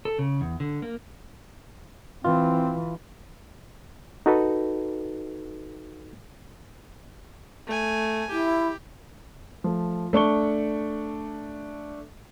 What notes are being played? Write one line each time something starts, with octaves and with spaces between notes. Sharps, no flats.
A4
C#3
E2
D3
A#3
E3 C4 F4
D#4 F#4 A4 B4
A3 G#5
E4 G4
F3 A3
A3 D4 C#6 G7